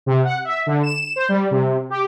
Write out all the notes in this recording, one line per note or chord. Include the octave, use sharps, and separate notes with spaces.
C3
F#5
E5
D3
E7
C5
G3
C3
G4